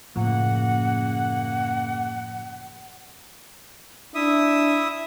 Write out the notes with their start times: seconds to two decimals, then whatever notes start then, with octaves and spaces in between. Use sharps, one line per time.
0.16 F#2 A2 C#3 F3 A#3 F#5
4.15 D4 E4 E5 D#6